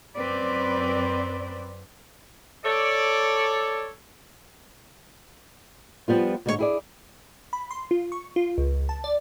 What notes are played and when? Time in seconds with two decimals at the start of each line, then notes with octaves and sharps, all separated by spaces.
0.16 F#2 C4 B4 D5
2.65 A4 C#5 D5
6.08 F3 G3 B3 F4
6.46 D2 G#2 G#3 E4 C#5
6.59 E4 G#4 D5
7.53 B5
7.71 C6
7.91 F4
8.12 C#6
8.36 F4
8.58 C#2
8.89 A5
9.04 D5